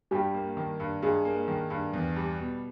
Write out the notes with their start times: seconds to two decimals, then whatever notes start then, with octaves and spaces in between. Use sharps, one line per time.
0.11 G2 G3 G4
0.34 A#3
0.57 D#3
0.80 G2
1.02 G2 G#3 G#4
1.25 A#3
1.48 D#3
1.70 G2
1.93 E2
2.16 G3
2.39 B2